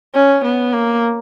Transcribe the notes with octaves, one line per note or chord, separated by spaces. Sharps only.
C#4
B3
A#3